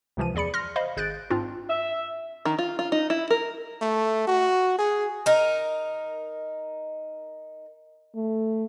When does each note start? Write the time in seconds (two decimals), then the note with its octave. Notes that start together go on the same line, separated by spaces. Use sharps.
0.17 C#2 C3 E3 F3 D#7
0.35 E2 G#4 D5 B5 C#7
0.54 C6 F6 A#6
0.76 C5 D#5 F5 B5
0.97 G#1 G#4 F#6 G6 A6 D7
1.30 G#2 C4 D4 F4
1.69 E5
2.45 D#3
2.59 F4
2.79 F4
2.92 D#4
3.10 E4
3.30 A#4
3.81 A3
4.27 F#4
4.79 G#4
5.26 D#4 A#4
8.16 A3